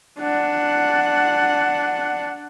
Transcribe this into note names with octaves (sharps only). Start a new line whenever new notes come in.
D4 F#5